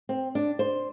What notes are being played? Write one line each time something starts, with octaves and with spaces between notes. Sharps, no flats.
C4
D4
C5